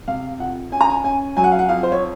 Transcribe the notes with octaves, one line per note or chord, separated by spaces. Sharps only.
C3 F5
F2 F#5
C#4 G#5
A#5
G#5
C#4 G#5
F#3 G#5
F#5
F5
F#5
F2 F5
C5
C#5